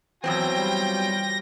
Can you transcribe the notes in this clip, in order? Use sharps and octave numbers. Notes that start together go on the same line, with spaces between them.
E2 F#3 C4 F4 G5 A#6
G3